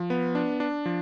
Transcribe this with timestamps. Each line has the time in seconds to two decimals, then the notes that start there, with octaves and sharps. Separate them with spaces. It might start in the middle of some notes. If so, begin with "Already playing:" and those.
Already playing: F3
0.10 B3
0.35 D4
0.60 D4
0.86 F3